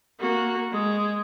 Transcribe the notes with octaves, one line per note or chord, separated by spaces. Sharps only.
A#3 F#4
G#3